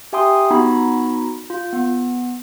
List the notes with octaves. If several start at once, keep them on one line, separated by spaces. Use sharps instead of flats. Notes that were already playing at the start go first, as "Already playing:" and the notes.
G4 E5 G5 G#5 C6 D#6
B3 D#4 F#4 A#5 B5
F4
B3